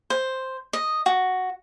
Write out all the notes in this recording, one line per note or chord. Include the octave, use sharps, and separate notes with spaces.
C5
D#5
F#4